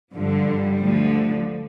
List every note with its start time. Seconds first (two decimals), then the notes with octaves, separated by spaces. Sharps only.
0.13 G2 D3 F3
0.46 G3
0.80 D2 D3 F3